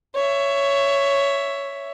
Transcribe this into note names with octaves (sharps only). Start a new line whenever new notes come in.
C#5 E5